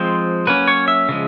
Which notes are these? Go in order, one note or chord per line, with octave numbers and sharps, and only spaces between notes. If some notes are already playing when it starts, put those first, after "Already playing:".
Already playing: F3 G#3 C4 C5
F#3 A#3 C#4 B4
C#5
E5
C#3 F3 G#3